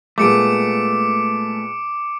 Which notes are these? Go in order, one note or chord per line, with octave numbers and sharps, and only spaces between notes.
A#2 G#3 A3 B3 D6 C#7 D7